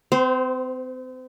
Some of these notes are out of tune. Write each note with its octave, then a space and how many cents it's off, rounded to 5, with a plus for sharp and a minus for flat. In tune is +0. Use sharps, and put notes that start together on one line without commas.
C4 -35 C5 +0